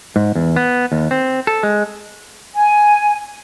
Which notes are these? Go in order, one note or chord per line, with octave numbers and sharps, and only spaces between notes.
G#2
E2
B3
D#2
C4
A4
G#3
G#5